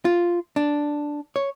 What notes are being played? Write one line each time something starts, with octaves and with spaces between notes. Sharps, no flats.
F4
D4
C#5